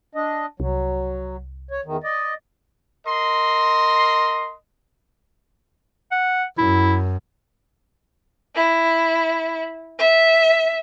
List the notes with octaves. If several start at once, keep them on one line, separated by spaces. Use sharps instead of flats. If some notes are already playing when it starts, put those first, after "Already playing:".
D4 D#5
C2 F#3
C#5
E2 D#3
D5 D#5
A#4 D#5 C6
F#5
F#2 E4
E4
E5